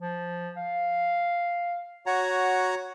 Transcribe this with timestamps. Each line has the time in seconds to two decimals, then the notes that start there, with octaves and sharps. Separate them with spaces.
0.01 F3
0.57 F5
2.06 F#4 C#5 F#5 A#5